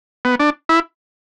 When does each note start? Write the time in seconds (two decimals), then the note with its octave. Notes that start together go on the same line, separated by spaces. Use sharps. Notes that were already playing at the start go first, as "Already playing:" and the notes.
0.25 B3
0.40 D4
0.69 E4